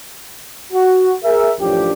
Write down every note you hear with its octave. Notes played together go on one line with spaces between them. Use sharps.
F#4
G#4 A#4 E5
A1 F#2 F3 D4 G4